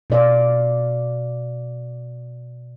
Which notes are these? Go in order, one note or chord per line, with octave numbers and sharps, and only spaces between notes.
B2 D5 F5